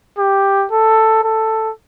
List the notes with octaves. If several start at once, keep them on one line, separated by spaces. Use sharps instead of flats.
G4
A4
A4